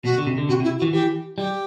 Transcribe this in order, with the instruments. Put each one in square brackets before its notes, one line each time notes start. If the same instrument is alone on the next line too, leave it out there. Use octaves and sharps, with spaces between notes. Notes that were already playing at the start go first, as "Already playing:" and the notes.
[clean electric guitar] B2 [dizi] F#4
[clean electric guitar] D3
C3
D3
[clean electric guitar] C3 [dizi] F#4
[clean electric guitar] C3
[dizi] E4
F#4
[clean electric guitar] E3
[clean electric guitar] E3 [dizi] G4
[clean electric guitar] G3 [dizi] G4